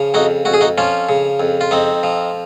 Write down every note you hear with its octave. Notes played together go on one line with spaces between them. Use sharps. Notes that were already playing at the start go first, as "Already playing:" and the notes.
Already playing: C#3 F3
F2 D#4 F#4
F2 F#4
G#4
D#4 F#4
F3 C#4 F4
C#3
F2
F4
F2 C4 D#4
F3